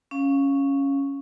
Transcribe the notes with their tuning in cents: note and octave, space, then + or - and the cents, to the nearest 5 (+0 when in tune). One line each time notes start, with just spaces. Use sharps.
C#4 -5 F5 +5